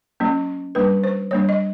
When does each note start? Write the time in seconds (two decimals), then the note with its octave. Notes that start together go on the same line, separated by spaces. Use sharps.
0.20 F#3 A#3 C#4
0.75 G3 A#3 D4 B4
1.04 C5
1.31 G3 A#3 D4 C#5
1.49 D#5